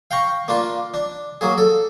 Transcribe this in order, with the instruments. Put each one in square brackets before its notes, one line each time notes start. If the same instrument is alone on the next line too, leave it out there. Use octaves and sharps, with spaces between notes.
[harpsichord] F5 G5 A#5 C#6
A#3 D4 F4
D4
F#3 A#3 G#4
A4